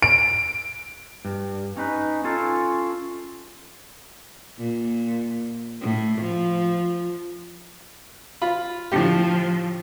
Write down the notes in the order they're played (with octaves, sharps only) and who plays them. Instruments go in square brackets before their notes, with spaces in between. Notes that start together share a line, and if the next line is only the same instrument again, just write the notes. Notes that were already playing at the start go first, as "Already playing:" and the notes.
[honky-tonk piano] D7
[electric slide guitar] G2
C#4 D#4 B4
C#4 F4 A4
[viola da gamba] A#2
A2
F3
[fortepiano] F4 B5
[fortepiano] A2 D3 G4 [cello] F3